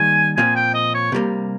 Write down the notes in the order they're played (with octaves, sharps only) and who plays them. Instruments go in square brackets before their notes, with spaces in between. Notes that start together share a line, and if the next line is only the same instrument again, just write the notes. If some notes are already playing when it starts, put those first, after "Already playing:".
Already playing: [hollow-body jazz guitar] D#3 G3 A#3 [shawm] G#5
[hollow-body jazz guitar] A#2 F3 C4 [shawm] G#5
[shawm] G5
D#5
C#5
[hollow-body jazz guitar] C3 G3 A#3